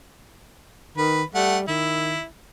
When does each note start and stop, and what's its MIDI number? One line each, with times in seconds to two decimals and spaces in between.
0.97 1.23 51
0.97 1.22 71
1.35 1.66 55
1.35 1.58 57
1.35 1.58 78
1.68 2.18 51
1.68 2.24 64